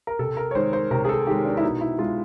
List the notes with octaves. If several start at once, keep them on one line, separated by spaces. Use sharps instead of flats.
A#4
C3 A4
A#4
C#5
D#3 G#3 C5
C5
C3 A#4
G#4
A4
D#3 G#3 G4
D4
E4
B2 D#4
E4
G#3 F4